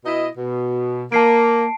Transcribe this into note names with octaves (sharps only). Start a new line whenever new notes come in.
B2 E4 D#5
B2
A#3 A5 C7 D7